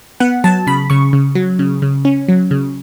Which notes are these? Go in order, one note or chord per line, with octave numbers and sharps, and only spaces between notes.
B3 F#5
F#3 A5
C#3 B5
C#3 C#6
C#3
F#3
C#3
C#3
C#4
F#3
C#3